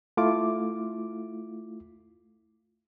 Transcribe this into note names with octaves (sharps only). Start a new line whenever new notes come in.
A3 E4 F4 D6